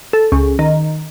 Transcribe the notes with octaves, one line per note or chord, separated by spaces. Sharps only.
A4
C#2
D#3